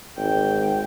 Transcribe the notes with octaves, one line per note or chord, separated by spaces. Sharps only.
G#1 G5